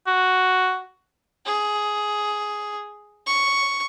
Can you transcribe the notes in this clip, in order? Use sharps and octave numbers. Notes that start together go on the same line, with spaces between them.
F#4
G#4
C#6